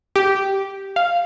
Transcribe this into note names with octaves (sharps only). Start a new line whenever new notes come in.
G4
F5